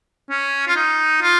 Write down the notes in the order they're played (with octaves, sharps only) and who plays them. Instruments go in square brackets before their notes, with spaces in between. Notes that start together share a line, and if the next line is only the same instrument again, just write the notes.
[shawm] C#4
F4
D#4
F4